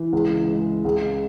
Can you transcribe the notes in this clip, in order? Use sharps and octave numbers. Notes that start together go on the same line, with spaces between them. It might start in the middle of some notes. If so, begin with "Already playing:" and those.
Already playing: E3
C#2
G#3
C#2